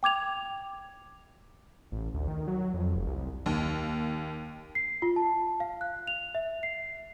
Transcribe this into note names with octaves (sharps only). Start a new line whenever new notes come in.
G5 D6 G#6 F7
A1
D2
D#3
F#3
F2
F1
C2
D#2
C7
F4
A5
F5
F#6
F7
E5
C7